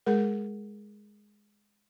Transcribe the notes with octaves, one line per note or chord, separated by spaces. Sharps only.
G#3 G#4 A#4